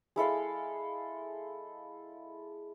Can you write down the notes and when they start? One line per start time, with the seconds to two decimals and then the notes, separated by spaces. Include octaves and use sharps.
0.16 G#3 E4 A4 F5